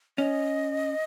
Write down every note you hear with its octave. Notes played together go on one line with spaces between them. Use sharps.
C#4 D#5